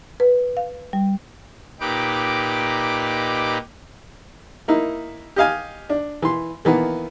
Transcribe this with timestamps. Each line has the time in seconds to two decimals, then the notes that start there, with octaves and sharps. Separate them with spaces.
0.20 B4
0.57 F5
0.93 G3
1.80 A#2 D#4 G4 B4 D6
4.68 A#3 D#4 E4
5.36 G4 D#5 F5 G#5
5.89 D4
6.22 E3 C6
6.65 D#3 E3 A#3 B3